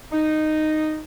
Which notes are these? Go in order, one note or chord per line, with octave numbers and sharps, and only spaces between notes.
D#4